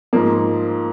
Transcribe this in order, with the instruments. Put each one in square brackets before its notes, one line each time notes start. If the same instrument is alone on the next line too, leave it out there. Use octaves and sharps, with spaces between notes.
[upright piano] G#2 F3 A#3